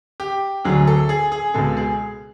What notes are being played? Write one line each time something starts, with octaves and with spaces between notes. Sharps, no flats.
G4
D2 D3 F#3 G#4
A4
G#4
G#4
C#2 B2 G#3 A4
G#4